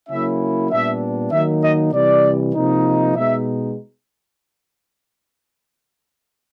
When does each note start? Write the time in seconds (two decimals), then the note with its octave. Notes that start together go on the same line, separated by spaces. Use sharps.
0.09 C#3 F#3 A#3 C#4 E4 E5
0.71 A#2 G3 B3 D4 E5
1.32 D#3 F#3 A#3 D#4 E5
1.63 D#5
1.93 C3 E3 G3 D5
2.55 C3 F3 A#3 D#4
3.16 B2 G#3 B3 D#4 E5